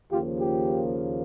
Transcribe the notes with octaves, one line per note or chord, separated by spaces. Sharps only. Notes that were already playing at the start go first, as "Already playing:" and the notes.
D#2 C#3 F3 A#3 F4 G4
F4 G4